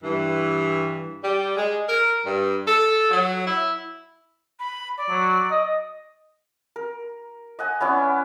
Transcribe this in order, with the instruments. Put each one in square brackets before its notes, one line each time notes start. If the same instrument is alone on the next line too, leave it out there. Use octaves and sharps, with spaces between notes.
[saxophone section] G2 E3
[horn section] G3
G#3
A#4
G2
A4
F#3
E4
[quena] B5
D5
[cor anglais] F#3
D#5
[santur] A#4
D#5 F#5 G#5
B3 C#4 E4 D5